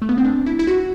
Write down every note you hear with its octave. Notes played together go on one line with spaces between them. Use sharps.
A3
B3
C4
D4
E4
E4
F#4